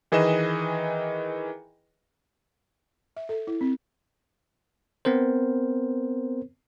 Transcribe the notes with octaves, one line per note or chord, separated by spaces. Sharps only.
D#3 E3 G#4 B4 D#5 E7
E5
A4
E4
C4
B3 C4 A#4 C5